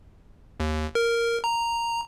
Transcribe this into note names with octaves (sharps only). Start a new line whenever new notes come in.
D#2
A#4
A#5